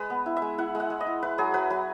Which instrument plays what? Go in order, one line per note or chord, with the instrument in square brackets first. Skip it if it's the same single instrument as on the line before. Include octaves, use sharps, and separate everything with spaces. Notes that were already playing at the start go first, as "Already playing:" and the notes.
Already playing: [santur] G#3 B4
B3
E4
E5
G#3
E4 F#5
G#3
F#5
G#3
D#5
E4
E4 B4
F#3 G#4
F#3 B4
F#3 B4